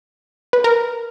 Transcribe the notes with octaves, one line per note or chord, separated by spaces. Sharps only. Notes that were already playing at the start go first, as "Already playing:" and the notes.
B4
A#4